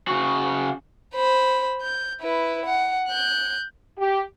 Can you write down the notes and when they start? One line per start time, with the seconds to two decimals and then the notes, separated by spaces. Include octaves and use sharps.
0.07 C#3 F#4
1.15 C5 B5
1.82 G6
2.21 E4 B4
2.65 F#5
3.08 F#6 G6
3.98 G4